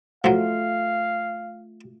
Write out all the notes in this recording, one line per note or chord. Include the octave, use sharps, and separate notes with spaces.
F3 F#3 A3 F4 F5